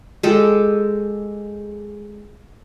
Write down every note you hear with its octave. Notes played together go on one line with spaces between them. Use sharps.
G#3 G4 A4